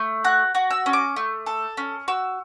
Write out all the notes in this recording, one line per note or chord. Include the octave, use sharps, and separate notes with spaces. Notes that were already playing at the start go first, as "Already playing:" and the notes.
Already playing: A3
F#4 F#6
F#4
E6
C#4
D6
A3
A4
C#4
F#4 E6